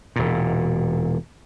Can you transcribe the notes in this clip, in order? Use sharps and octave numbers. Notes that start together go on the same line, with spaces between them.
E1 A#2